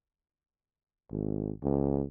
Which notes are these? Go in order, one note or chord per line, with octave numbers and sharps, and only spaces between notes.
G#1
C#2